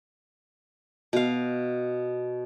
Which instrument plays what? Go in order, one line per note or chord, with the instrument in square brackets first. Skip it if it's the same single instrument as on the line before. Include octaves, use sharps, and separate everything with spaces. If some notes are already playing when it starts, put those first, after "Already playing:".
[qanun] B2 F5